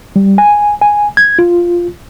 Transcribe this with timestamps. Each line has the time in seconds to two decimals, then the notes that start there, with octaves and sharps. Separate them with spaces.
0.16 G3
0.38 G#5
0.81 G#5
1.17 G#6
1.39 F4